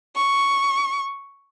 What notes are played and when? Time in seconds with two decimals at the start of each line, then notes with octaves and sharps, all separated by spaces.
0.16 C#6